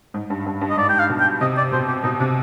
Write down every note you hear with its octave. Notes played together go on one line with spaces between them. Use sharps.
G#2
G2
G2
G2
D#5
G#2 D5
G5
F5
B2
G5
C3 D#5
D5
B2 C5
G4
B2 D#4
C3 D4